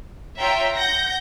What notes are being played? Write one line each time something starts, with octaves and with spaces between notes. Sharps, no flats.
F4 C#5 E5 G5 A#5
F#5 G6 A#6